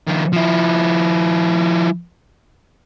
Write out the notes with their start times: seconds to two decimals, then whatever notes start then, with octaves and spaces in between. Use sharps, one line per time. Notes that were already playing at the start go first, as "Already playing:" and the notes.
0.07 D#3 F3
0.33 F3 E4